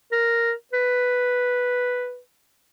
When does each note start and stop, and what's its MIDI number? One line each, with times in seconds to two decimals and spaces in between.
0.12 0.53 70
0.73 2.19 71